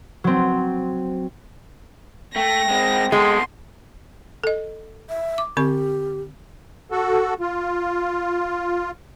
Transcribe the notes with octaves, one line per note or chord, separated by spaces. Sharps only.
F#3 C4
A3 G5 A#6
G#3 C4
B2 G#3 A4 C6
A4 D#5
E5
D6
D3 C4 G4 C#6
F#4 A4
F4